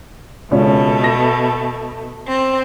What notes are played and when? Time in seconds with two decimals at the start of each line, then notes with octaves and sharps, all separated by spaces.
0.51 C#2 B2 A3 C#4
1.04 A#6
2.26 C4